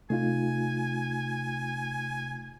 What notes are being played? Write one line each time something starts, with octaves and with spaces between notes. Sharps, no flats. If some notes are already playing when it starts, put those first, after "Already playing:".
C3 A3 D#4 F4 G#5